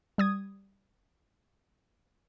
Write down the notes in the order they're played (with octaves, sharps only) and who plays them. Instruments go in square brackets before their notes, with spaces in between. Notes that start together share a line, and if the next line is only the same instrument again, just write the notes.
[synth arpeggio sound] G3 D#6 G#6